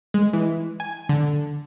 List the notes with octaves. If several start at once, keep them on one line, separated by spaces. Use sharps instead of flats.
G#3
E3
G#5
D3